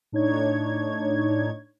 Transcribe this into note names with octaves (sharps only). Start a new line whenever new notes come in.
A2 D4 D#4 C#5 G#6